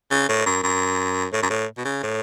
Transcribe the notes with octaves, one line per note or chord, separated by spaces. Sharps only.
C#3
A2
F#2
F#2
A2
F#2
A2
B2
C#3
A2